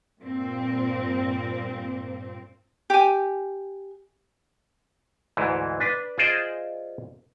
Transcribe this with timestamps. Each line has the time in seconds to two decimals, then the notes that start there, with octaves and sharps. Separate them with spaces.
0.19 G2 A#2 C4
2.90 G4 G#5
5.37 D2 G#2 E3
5.80 D4 B4
6.18 F4 G#4 C5 D5 D#5